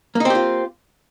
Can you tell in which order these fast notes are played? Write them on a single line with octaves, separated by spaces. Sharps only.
A#3 D#4 C4 G4 F4